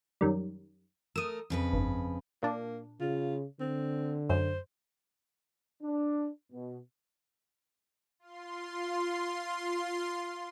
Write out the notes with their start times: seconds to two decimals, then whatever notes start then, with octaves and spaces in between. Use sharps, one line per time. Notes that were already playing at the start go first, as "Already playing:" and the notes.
0.21 F#2 D#3 G3
1.16 A3 A#4 D#6 E6
1.50 F2 C#3 B4
1.73 G1
2.43 A#2 A#3 D4
3.00 C#3 F4
3.60 D3 C4
4.30 F#2 C5
5.82 D4
6.52 B2
8.19 F4 C6